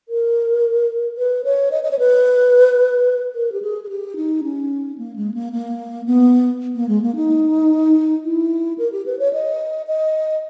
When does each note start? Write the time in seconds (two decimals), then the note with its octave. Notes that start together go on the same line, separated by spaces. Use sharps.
0.09 A#4
1.17 B4
1.45 C#5
1.71 D#5
1.83 D#5
1.91 C#5
1.99 B4
3.35 A#4
3.52 G4
3.62 G#4
3.83 G#4
3.89 G4
4.16 D#4
4.44 C#4
4.98 A#3
5.16 G#3
5.34 A#3
5.53 A#3
6.06 B3
6.75 A#3
6.89 G#3
7.02 A#3
7.16 D#4
8.24 E4
8.78 A#4
8.92 G4
9.06 B4
9.19 C#5
9.33 D#5
9.87 D#5